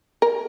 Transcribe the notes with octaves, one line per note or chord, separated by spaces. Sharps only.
A#4